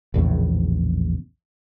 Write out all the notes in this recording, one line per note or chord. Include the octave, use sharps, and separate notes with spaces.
A#1 E2 A2 C#3